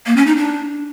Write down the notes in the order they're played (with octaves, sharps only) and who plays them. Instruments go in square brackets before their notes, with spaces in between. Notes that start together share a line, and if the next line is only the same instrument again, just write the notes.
[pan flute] A#3
C#4
D#4
D4